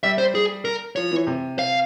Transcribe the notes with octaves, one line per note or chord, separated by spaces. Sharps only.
G3 E5
C5
G#4
A#4
F3 C#5
E3
C3
F5